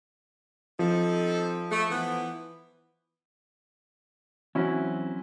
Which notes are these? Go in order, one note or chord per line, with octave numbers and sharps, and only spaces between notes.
F3 C4 D#4 A4
A3
E3 B3
E3 F#3 C4 C#4 E4 F#4